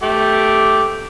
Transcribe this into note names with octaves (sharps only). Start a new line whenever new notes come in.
A3 G4 D6